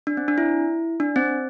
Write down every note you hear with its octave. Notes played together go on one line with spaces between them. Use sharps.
D4
C4
D4
E4
D4
C4